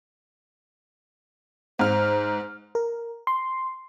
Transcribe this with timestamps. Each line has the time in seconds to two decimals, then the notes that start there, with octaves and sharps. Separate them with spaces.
1.79 G#2 C5 F6
2.75 A#4
3.27 C6